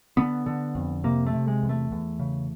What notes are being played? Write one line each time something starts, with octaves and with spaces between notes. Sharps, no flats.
D3 B3
D3
F2
C3 A#3
A3
C3
G#3
E2
A3
E2
C#3